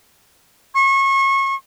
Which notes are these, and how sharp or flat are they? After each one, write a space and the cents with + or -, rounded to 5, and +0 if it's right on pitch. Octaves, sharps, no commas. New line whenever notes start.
C#6 -30